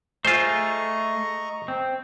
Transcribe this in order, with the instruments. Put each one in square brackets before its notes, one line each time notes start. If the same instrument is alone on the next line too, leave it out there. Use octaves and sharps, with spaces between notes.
[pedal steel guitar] A3 G#4 [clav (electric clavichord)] F4 C5 [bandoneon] D#5 A#5 C#6
[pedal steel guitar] C4